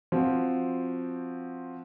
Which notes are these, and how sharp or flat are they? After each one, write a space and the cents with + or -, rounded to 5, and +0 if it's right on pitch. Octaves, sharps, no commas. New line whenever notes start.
F3 +0 C4 +0 F#4 +0